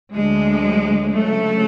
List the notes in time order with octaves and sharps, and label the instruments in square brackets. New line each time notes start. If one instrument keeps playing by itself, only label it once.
[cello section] D2 D3 F#3 G#3
D2 C#3 F#3 A3